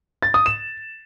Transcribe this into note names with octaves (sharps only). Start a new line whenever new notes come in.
A6
D#6
E7